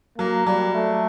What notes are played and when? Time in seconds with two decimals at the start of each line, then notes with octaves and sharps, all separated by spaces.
0.18 F#3 A#3
0.46 F#3 G3
0.74 A3